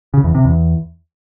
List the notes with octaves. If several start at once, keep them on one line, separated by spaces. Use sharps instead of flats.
C#3
E2
C3
E2